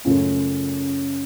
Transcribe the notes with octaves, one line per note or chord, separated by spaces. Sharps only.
F#2 C#3 A3 C#4 F4